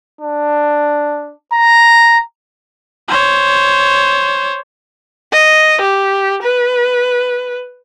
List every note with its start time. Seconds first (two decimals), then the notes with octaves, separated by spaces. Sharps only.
0.21 D4
1.53 A#5
3.08 C5 C#5
5.32 D#5
5.81 G4
6.42 B4